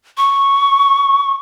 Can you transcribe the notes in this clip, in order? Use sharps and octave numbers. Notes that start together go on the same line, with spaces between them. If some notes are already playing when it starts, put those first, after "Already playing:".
C#6